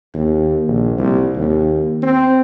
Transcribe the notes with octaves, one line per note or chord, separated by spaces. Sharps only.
D#2
A#1
C2
D#2
C4